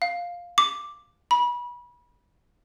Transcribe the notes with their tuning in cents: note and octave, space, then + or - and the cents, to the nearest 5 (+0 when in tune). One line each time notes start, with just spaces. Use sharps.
F5 +5
D6 +0
B5 -30